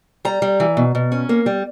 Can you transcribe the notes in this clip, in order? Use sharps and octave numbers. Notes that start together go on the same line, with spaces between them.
G3 A#5
G3
E3
B2
B2
C#4
A#3
G3